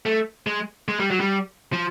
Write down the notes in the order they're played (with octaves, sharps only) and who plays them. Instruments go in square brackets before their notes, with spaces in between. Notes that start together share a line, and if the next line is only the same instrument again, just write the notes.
[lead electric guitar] A3
G#3
G#3
G3
F#3
G3
F3